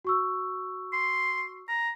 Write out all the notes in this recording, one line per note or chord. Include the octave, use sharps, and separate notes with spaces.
F#4 C#6 E6
C6
A#5